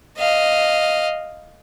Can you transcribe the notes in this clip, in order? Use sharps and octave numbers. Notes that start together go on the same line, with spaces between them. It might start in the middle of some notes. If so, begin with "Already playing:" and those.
D#5 F5